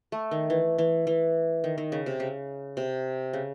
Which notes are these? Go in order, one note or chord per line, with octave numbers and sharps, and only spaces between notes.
A3
D#3
E3
E3
E3
D#3
D#3
C#3
C3
C#3
C3
C#3